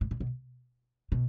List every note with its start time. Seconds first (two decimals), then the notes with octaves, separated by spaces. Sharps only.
0.01 A2
0.11 A#2
0.20 B2
1.12 B2